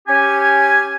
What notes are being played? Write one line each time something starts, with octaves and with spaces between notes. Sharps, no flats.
C#4 G4 G#5